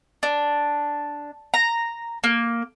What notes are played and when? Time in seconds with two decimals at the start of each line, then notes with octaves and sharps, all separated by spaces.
0.23 D4
1.54 A#5
2.24 A#3